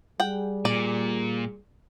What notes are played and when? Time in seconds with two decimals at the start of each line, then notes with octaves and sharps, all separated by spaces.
0.20 G3 G#4 F#5 G5
0.65 A#2 D5